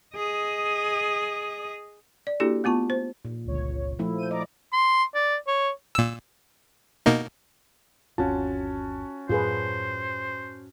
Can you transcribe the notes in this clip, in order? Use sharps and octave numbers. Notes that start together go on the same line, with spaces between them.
G#4 D#5
D5
A#3 D4 E4 F#4 G4 A4
A3 B3 F4 A5 C#6
C5
A#2
G1 C#2 C#5
F3 A3 E4
G6 D#7
D5 D#5 A#5 D6
C6
D5
C#5
A#2 E6
B2 A#3 D#4
G1 D#2 C4 C#4 F4 F#4 A5
F#2 A2 F#3 F4 G#4 B4 C5